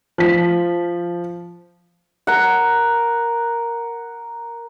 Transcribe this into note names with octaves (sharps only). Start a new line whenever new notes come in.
F3 B6
A#4 F#5